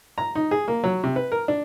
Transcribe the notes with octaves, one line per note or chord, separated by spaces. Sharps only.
A#5
D#4
G#4
A#3
F#3
C3
B4
A#4
D4